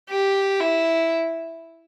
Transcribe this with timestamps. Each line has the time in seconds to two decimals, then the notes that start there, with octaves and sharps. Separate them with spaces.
0.10 G4
0.61 E4